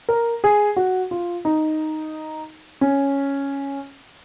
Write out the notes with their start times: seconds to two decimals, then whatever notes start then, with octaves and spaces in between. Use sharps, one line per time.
0.09 A#4
0.44 G#4
0.77 F#4
1.11 F4
1.45 D#4
2.81 C#4